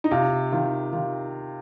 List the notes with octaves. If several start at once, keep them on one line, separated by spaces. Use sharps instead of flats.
D#4
C3 F4
D#3 F4
D#3 F4